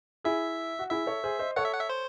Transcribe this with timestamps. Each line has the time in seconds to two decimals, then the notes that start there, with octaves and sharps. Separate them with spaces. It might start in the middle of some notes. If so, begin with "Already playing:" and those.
0.24 E4 G#4 E5
0.79 F#4
0.91 E4 G#4 E5
1.06 A4 C#5
1.24 G#4 C5
1.39 C5 D#5
1.56 A4 C#5 F#5
1.65 E5
1.73 F#5
1.81 E5
1.90 C5